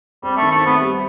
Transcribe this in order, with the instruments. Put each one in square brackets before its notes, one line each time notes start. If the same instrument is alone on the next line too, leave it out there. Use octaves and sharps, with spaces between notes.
[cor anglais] G3 [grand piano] C4
[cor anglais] A3
[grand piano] D#3
[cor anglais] A3
[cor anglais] B3 [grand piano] C4
[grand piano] G3